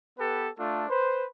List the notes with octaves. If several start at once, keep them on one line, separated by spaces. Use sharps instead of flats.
B3 G4 A4 B4
A3 D4 F4 A4
B4 C5